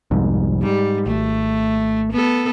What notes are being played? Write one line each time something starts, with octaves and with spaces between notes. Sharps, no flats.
C2 F2 G#2
G#2 G3
G#1 A3
B3 A4